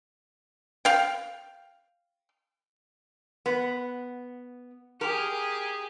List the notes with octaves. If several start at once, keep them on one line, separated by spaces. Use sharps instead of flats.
F5 G5
B3
G4 G#4 A#4